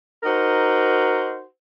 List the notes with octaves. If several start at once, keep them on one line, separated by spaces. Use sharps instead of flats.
D#4 F#4 A#4 C5